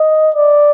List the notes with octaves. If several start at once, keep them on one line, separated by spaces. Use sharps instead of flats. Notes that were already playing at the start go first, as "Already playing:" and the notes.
Already playing: D#5
D5